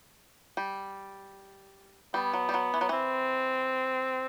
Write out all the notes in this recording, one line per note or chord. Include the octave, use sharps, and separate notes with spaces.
G3
G3 B3
F#3
G3
F#3
E3
F#3
E3 C4